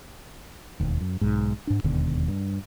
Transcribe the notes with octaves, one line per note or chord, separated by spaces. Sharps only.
E1 D#2
F#2
B1 G#2
G#2 D4
E1 D#2 B2 D3
G2